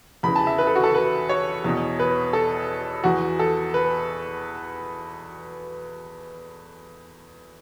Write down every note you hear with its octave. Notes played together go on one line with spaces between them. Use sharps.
E2 C#3 E3 B5
A5
E5
B4
A4
F#4
A4
B4
C#5
E2 B2
B4
A4
E2 E3 F#4
A4
B4